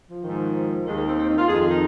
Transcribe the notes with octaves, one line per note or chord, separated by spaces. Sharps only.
F3
G#2 D#3
D#2 D#3 G#3
A#3
C4
C4
D#4
F4
F2 D#3 G#4
F4
D#4